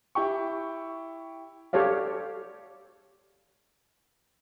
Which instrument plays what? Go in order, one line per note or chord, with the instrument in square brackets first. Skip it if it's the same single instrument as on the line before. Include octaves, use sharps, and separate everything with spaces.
[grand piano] E4 G4 G5 C#6
[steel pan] G4 A4 C#5 D5 F5